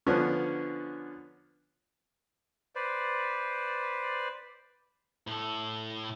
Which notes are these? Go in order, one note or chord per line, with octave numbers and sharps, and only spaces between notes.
D3 F3 B3 C#4 D4
B4 C5 D5
A2 A4